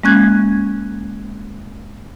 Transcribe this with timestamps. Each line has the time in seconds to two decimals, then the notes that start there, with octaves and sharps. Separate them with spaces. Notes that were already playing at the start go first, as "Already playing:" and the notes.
0.04 G#3 A#3 C#4 F#6 G#6